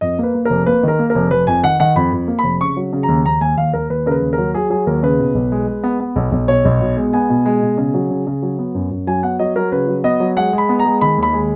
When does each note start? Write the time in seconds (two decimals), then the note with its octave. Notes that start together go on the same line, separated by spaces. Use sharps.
0.01 F2 D#5
0.18 A#3 B4
0.34 A#3
0.45 F1 A#4
0.66 A#3 B4
0.83 D#3 A#4
0.99 A#3
1.10 A#4
1.15 F1
1.31 F1 B4
1.47 F2 G#5
1.63 D#3 F#5
1.80 D#3 F#5
1.96 F2 B5
2.13 F2
2.27 A#3
2.39 B5
2.44 F1
2.60 C#3 C#6
2.77 F#3
2.93 C#3
3.03 A#5
3.08 D#2
3.25 D#2 A#5
3.41 D#2 G#5
3.57 D#2 F5
3.73 D#2 A#4
3.90 D#2 B4
4.06 C#3 A#4
4.11 B4
4.22 D#2
4.33 A#4
4.38 F#3
4.54 F#3 G#4
4.70 F#3 G#4
4.87 D#2 A#4
5.03 C#3 B4
5.19 B2
5.35 B1
5.52 G#3
5.67 G#3
5.84 B3
6.00 B3
6.16 B1
6.32 B1
6.48 B2 C#5
6.65 B1
6.81 B2
6.97 G#3
7.13 B3 G#5
7.30 B2
7.46 G#3
7.62 B2
7.78 C#3
7.94 F#3
8.10 C#3
8.27 C#3
8.42 F#3
8.59 B3
8.75 F#2
8.91 F#2
9.07 F#3 G#5
9.23 B3 F#5
9.39 F#3 D#5
9.56 F#3 A#4
9.72 C#3 B4
9.88 F#3
10.04 B3 D#5
10.20 F#3
10.36 G#3 F#5
10.53 G#3
10.58 B5
10.69 B3
10.79 A#5
10.85 G#3
11.01 D#3 B5
11.18 D#2 B5
11.33 G#3